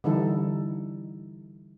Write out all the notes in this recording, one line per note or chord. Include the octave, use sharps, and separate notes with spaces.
D3 E3 G3 D#4 E4 A4